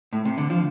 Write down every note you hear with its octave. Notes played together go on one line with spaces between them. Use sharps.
A2
C3
D3
F3